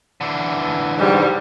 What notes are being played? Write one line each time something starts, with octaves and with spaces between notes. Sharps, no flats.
D3 E3
G#2 G3